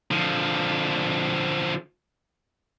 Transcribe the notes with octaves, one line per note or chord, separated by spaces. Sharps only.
D3 F3